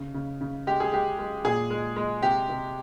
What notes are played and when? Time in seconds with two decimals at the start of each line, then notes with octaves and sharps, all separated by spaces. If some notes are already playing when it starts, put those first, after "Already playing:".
Already playing: C#3
0.14 C#3
0.41 C#3
0.67 G#3 G4
0.80 G#4
0.93 G#3 G4
1.19 G#3
1.44 A#2 G#4
1.70 G#3
1.96 G#3
2.22 C3 G4
2.49 C3